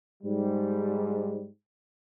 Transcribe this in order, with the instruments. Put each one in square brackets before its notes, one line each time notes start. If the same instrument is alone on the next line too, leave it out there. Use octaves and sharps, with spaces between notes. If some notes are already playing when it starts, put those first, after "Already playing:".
[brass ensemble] G#2 G3